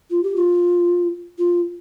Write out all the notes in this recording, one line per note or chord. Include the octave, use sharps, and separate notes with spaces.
F4
G4
F4
F4